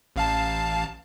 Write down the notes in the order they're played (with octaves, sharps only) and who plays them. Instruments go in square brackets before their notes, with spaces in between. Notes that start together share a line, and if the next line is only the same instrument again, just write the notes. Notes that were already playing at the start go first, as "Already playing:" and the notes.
[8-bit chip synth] A1 F5 A5